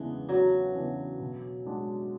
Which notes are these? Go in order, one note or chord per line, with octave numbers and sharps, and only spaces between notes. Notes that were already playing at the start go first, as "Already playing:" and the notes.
Already playing: E2 C#3 E3 G#3 B3 D4
E2 F#3
C#3 E3 B3 D4
B2
G#3 D4 F#4